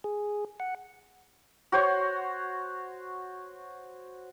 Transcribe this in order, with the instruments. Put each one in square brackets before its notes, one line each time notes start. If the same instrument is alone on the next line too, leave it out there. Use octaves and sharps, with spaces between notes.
[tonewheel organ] G#4
F#5
[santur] F#4 C5 C#5